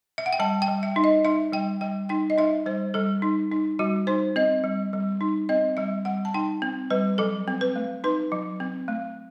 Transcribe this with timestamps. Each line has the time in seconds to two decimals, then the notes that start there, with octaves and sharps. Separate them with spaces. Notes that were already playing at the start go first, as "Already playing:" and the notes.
0.18 E5
0.26 F#5
0.33 G5
0.39 G3 A5
0.62 G5
0.68 G3
0.83 E5
0.96 D#4
1.04 D#5
1.25 D#4 E5
1.53 G3 G5
1.81 G3 G5
2.09 D#4 G5
2.30 D#5
2.38 D#4 E5
2.66 G3 C5
2.94 G3 A4
3.22 D#4
3.52 D#4
3.79 G3 F#4
4.07 D#4 C5
4.36 C4 D#5
4.64 G3
4.93 G3
5.21 D#4
5.49 C4 D#5
5.77 G3 E5
6.05 G3 F#5
6.25 A5
6.34 D#4 G5
6.62 C4
6.90 G3 B4
7.18 F#3 A4
7.48 C4
7.61 B4
7.76 A3
8.04 D#4 B4
8.32 F#3
8.60 C4
8.88 A3